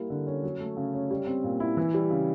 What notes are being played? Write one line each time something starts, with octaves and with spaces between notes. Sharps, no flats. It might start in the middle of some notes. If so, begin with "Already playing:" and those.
Already playing: G3 A#3 E4
D3
C#4
F#3
A3
C#3
C#4
G3
C4
A#2
E4
E3
G3
C#3